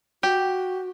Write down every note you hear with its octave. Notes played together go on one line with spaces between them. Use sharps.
F#4 G4